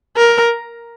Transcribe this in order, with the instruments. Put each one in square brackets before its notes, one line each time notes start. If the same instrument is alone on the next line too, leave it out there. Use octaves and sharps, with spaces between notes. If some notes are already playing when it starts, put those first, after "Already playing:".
[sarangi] A#4